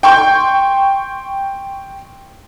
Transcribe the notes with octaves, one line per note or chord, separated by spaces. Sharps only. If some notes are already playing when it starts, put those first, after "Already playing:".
G5 C6 C#6 G6